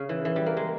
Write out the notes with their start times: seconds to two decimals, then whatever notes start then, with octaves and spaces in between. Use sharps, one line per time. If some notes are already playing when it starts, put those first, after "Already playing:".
Already playing: C#3
0.09 E3
0.25 E3
0.36 G3
0.46 A#3
0.57 G#3